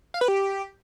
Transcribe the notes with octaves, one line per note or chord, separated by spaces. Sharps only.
F5
B4
G4